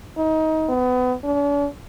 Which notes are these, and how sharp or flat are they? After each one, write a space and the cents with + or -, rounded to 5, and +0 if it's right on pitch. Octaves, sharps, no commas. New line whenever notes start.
D#4 +25
B3 +30
D4 -45